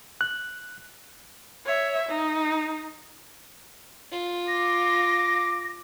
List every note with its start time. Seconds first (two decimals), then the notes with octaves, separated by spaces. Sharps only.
0.21 F#6
1.66 C#5 E5
2.09 D#4
4.12 F4
4.48 D6 A#6